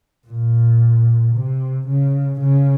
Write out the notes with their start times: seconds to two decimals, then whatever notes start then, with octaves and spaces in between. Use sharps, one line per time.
0.28 A#2
1.35 C3
1.88 C#3
2.41 C#3